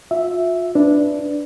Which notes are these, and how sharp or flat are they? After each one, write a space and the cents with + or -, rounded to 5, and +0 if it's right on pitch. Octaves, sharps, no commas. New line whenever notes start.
F4 +40 E5 +0
D4 +0 B4 +5